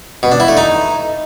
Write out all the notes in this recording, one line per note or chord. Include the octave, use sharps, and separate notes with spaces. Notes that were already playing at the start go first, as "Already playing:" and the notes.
B2
D4
E4
A3
D#4